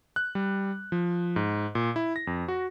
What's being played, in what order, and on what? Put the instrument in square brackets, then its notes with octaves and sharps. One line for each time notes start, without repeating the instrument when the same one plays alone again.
[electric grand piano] F#6
G3
F3
G#2
A#2
E4
A#6
F2
F#4